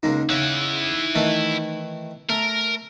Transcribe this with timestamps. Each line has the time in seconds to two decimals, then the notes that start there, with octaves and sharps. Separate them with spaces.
0.03 C#2 G#3 A#3 D#4
0.29 C#3 C#4 E4 F#5
1.15 D#3 E3 A3
2.29 A3 A#4